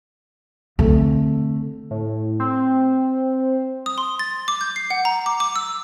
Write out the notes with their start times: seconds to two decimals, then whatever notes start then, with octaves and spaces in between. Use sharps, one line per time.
0.79 D3 A3 C4
1.91 A2
2.40 C4
3.86 D#6
3.98 C6
4.19 A6
4.48 D6
4.61 G6
4.76 C7
4.90 F#5
5.05 A#5
5.26 D6
5.40 D6
5.56 E6